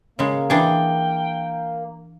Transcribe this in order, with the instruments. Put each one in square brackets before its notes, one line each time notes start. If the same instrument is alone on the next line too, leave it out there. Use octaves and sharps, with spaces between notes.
[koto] C#3 G#3 [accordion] A#3
[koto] E3 D4 G#4 [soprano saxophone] G5